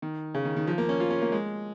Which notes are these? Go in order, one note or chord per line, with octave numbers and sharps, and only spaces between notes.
D#3
C#3
D#3
D#3
F3
A#3
C#4
F4
C#4
A#3
G#3